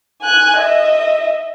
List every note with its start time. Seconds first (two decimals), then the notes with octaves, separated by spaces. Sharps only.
0.22 G#5 F#6
0.58 D#5 E5